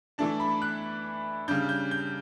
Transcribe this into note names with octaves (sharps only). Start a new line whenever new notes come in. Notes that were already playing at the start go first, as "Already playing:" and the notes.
E3 A3 D4 A5
B5
F#6
C#3 G3 D4 G6
G6
G6